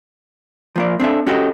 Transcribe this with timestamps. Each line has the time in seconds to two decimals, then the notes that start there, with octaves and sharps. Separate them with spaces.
0.76 F3 A#3 D5
1.00 C4 D4 A4 E5
1.27 C#4 F#4 G4 A4 D#5